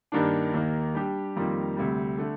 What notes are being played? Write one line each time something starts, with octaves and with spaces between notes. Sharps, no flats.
G2 D#3 A#3 D4
D#2 D#3 A#3
G3 D4 G4
F2 D#3 G3 A#3 F4
D2 C3 G3
D3 A3